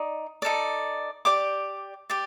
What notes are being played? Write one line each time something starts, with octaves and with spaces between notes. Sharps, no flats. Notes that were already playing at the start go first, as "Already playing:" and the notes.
Already playing: D#4 D5
D#4 A4 D5
G4 D5 D6
G4 D5